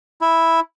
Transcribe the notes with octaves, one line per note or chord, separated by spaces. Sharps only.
E4